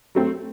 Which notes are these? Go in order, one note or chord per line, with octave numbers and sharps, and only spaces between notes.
F#3 A3 C4